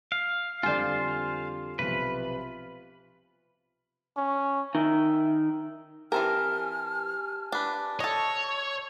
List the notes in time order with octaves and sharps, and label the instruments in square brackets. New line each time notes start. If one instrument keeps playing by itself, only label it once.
[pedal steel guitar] F5
[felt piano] F2 D3 G3 [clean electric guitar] F4 C5 [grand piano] D5 G#5
[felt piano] B1 C3 F3 [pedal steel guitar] B4
[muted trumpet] C#4
[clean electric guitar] D#3 [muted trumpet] E5
[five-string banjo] E3 C4 A#4 [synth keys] G4 G#5 A5 [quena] F6
[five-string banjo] D4 B4
[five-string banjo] A4 D#5 [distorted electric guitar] C#5 [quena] C#6